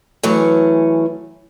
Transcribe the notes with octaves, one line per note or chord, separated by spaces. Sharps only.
E3 F#3 A3 C#4